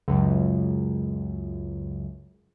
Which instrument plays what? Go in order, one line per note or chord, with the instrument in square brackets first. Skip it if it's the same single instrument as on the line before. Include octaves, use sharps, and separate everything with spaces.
[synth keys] C#2 F#2